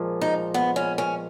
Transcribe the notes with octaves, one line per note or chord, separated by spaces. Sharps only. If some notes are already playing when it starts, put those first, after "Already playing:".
Already playing: A#2 F3 G#3
D#4
B3
C#4
C#4